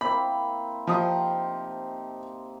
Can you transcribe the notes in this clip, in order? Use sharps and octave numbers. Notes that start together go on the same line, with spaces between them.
A#3 C4 E4 B5
C3 F3 D#4 C6 D#6